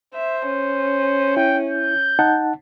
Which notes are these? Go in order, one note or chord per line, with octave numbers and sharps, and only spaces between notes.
C5 E5
C#4
E4 G5
G6
D#4 F#5 A5